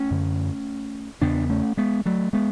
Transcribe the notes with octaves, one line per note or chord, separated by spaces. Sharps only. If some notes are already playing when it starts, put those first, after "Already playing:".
Already playing: A3 C#4
F#2 D3
E2 C#3 B3 D4
A3 C#4
G#3 B3
F#3 A3
G#3 B3